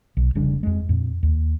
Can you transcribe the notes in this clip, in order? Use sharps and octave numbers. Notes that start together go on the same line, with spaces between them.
B1
F1 C#3 G3 D4
F2 G#3
F2 A#2
D#2